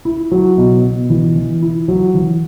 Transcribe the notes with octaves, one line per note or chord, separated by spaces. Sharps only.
E4
F#3
B2
B2
E3
E3
E4
F#3
E3